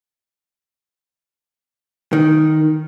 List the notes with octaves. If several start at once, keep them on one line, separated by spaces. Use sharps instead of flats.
D#3